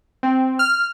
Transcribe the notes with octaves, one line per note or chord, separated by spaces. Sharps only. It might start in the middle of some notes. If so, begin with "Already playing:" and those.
C4
F6